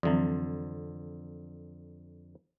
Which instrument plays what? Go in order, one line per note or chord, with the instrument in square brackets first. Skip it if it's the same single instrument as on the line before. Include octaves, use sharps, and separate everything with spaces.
[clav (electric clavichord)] F2 D3 [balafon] E3 F#3 C4